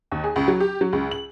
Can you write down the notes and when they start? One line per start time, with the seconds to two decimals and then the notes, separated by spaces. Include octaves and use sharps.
0.12 D#2
0.24 G#4
0.36 C#2
0.48 F#3
0.60 G4
0.81 F#3
0.93 C#2
1.11 F#7